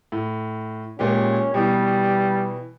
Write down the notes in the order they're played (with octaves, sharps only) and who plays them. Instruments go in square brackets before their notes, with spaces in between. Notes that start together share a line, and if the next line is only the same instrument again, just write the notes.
[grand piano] A2
[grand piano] A#2 G#3 G4 [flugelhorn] C#4
[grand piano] B2 E3 [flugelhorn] G3